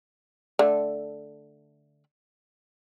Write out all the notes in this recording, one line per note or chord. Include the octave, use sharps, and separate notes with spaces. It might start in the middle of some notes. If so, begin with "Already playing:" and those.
D3 A3